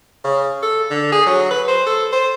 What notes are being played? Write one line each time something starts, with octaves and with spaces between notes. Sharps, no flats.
C#3
A4
D3
G#4
F#3
B4
C5
A4
C5